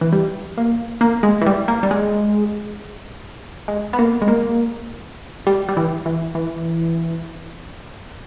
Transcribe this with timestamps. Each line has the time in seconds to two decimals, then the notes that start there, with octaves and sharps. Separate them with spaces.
0.01 E3
0.12 G3
0.58 A#3
1.01 A#3
1.23 G#3
1.41 E3
1.46 G3
1.68 A#3
1.83 G3
1.91 G#3
3.68 G#3
3.93 B3
3.99 A#3
4.22 G#3
4.28 A#3
5.47 G3
5.69 G3
5.77 E3
6.06 E3
6.35 E3